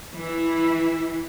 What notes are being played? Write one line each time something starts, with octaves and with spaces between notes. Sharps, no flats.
E3 E4